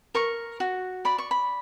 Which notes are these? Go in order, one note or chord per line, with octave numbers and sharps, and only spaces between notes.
A#4 C#6
F#4
D5 B5
C#6
B5